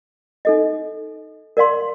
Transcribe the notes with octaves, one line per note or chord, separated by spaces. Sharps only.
D#4 A4 D#5
A#4 D5 F5 C6